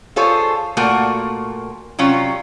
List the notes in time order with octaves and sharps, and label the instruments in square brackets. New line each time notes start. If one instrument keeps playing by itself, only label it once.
[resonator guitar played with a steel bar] F4 G#4 A4 C5 C#5
A#2 A3 A#3 F#4
C3 F#3 C#4 F4